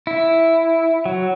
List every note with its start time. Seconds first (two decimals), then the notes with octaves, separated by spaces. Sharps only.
0.07 E4
1.06 F#3